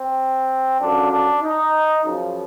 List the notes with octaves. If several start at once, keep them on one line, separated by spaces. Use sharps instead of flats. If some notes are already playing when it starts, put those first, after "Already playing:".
Already playing: C4
F#2 D3 F3 D4
D4
D#4
F#2 C#3 F3